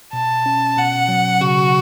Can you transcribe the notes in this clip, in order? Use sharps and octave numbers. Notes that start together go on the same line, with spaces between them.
B2 A5
C#4
B2 F#5
F#3
C#3 F#4